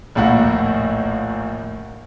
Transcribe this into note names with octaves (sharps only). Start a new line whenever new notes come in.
A#1 D#2 A2 A#3 F#5